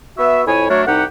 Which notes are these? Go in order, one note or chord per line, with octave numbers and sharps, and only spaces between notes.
B3 F#4 E5
F2 E4 C#5 G#5
F#3 A3 D4 A#4 C#5
C2 D#4 G4 F#5